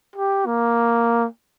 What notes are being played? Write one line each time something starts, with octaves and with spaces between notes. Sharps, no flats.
G4
A#3